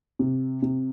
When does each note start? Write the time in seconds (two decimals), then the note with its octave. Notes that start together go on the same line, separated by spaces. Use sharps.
0.19 C3
0.62 C3